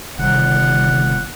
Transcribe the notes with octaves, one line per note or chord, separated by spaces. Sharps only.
G1 C3 D#3 G3 F#5